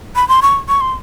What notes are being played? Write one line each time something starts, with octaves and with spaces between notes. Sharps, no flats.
B5
C6
C#6
C#6
C6